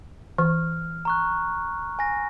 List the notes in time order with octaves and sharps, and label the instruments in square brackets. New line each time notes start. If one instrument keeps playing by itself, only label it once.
[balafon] E3 [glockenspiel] F6
[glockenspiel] A#5 C#6 F#6
G#5 A#6